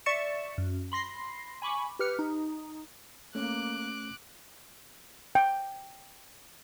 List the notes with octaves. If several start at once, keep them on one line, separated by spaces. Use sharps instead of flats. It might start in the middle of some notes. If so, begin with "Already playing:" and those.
D5 E5 C#6 A6 C#7 E7
F#2
B5 C6 A#6 C7
G#5 B5 C#6 D6
G4 B4 F6 C#7
D#4
A3 A#3 C#4 D6 F#6
G5